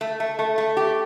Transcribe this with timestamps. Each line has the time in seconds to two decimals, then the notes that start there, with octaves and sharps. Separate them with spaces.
0.01 A3
0.20 A3
0.39 A3
0.58 A3
0.77 G4